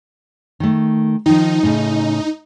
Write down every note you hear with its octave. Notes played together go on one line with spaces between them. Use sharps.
D#3 A3
D#3 F3 D#4
A2 C#3